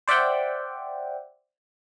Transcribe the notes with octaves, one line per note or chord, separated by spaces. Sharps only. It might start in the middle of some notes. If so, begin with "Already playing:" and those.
C5 D5 E5 F#5 G5